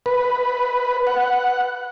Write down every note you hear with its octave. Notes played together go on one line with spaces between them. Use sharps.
B4
F#5